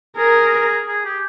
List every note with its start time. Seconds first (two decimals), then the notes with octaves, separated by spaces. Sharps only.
0.16 G#4 A#4
0.88 G#4
1.05 G4